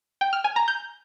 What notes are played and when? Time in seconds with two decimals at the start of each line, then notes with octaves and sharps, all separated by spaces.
0.21 G5
0.33 F6
0.44 G#5
0.56 A#5
0.68 G6